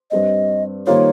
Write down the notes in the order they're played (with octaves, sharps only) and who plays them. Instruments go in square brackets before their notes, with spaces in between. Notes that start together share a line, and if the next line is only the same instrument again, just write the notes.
[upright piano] G2 G3 C4 [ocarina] D#5
[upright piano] D#3 G3 A#3 F4 C5 [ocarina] C#5